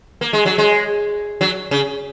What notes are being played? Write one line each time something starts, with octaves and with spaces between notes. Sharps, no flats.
A#3
G#3
F#3
G#3
F#3
C#3